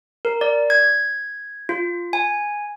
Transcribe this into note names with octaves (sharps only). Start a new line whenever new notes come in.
A#4
D5
G#6
F4
G#5